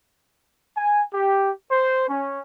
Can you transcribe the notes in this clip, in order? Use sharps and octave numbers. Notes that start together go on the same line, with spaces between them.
G#5
G4
C5
C#4